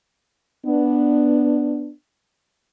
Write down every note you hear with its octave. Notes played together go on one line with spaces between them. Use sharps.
B3 D4